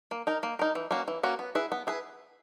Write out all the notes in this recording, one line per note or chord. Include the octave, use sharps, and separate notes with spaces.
A#3
D#4 A#4
A#3
D#4 A#4
E3
A#3 C#4 F#4
E3
A#3 C#4 F#4
B3
E4 G#4 B4
B3
E4 G#4 B4